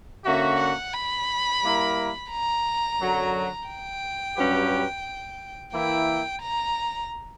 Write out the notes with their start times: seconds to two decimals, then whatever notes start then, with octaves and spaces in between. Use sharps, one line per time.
0.25 D3 A#3 C#4 F#4 E5
0.60 F#5
0.94 B5
1.63 G3 A#3 E4 A#4
2.30 A#5
2.99 F#2 D3 F#3
3.68 G5
4.36 G2 F#3 C#4 G4 B4
5.73 E3 A#3 E4 A#4 G5
6.41 A#5